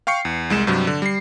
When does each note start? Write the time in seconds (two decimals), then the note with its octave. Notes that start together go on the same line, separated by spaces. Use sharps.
0.07 F5 G5 C#6 C7 C#7
0.25 E2
0.50 C2 G#3 E7
0.67 G2 C3 F#3
0.87 D3
1.02 G3 C7